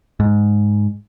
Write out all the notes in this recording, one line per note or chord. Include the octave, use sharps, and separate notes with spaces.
G#2